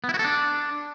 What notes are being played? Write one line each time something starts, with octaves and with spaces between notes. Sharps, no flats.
B3
E4
F#4
A4
D4